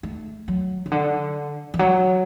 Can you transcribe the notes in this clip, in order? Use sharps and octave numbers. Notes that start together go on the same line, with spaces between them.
A3
F#3
C#3
D3
E3
F#3